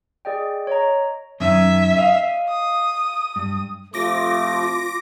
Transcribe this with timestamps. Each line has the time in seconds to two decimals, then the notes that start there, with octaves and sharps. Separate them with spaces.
0.25 G#4 D5 D#5 G5
0.67 C#5 D#5 A#5
1.40 F#2 D#3 C#4 E5
1.97 D#5 F5
2.49 D#6
3.36 G2
3.94 C3 F3 A3 F4 D6 A#6